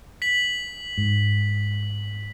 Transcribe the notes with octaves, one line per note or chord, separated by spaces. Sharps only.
B6 F#7
G#2